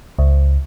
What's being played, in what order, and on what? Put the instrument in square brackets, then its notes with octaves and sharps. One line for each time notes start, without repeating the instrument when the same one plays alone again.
[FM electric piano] C#2